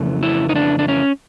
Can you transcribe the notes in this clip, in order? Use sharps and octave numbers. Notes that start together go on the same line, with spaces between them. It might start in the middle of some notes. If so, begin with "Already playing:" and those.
Already playing: F2 C#3 E3 A3
E4
D#4
D4
D4
C#4